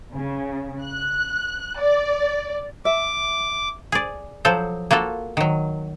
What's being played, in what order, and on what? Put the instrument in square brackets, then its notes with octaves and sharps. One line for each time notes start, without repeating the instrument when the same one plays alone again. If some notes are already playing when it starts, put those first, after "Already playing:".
[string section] C#3
F#6
D5
[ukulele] E5 [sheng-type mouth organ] D6
[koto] G#4 D5
F3 F#3 A4 C5
A#3 F4 F#4 A4
D#3 F#3